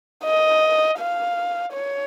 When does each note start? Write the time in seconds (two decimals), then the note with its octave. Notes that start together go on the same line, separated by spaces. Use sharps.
0.24 D#5
0.99 F5
1.73 C#5